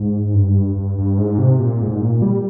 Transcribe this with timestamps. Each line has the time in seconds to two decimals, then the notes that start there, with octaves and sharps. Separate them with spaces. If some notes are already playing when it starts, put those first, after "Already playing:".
Already playing: G#2
0.34 G2
0.76 G2
0.98 G2
1.18 G#2
1.38 C3
1.59 A#2
1.80 G#2
1.91 G#2
2.01 A#2
2.22 G3